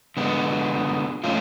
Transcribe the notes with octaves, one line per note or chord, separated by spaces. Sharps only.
D3 G#3 B3
F3 A3 C#4 F4